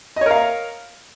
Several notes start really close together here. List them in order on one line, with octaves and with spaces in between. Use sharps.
D#5 C#5 A#4 F5